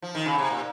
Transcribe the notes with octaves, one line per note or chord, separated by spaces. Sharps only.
F3
D#3
C#3
C3
A#2